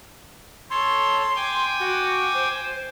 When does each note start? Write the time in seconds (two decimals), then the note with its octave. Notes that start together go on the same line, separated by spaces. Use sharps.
0.70 A4 C#5 C6
1.36 G5 G#5 D6
1.80 F#4
2.34 C5